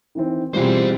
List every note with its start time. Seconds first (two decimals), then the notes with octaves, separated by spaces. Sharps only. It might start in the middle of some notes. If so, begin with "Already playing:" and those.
0.15 D#3 E3 C4
0.54 B2 E3 G3 C4 F4 G4 G#4 C5